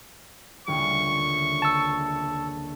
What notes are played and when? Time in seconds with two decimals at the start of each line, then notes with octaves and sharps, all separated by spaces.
0.67 D#1 D2 C#3 C#6
1.62 A5 E6